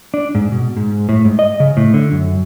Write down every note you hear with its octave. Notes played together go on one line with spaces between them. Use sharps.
D4
G#2
B2
G#2
A2
G#2
D#5
C#3
A2
D3
F#2